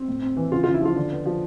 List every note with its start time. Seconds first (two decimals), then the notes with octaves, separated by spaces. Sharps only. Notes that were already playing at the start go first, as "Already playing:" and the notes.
Already playing: C4
0.08 A2
0.22 C4
0.37 E3
0.52 C#3 F4
0.63 F4
0.67 C#3
0.74 E4
0.81 F3 F4
0.96 D3
1.12 B3
1.26 F3